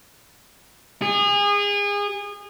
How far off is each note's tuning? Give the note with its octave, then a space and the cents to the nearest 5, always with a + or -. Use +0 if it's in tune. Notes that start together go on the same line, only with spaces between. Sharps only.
G#4 -30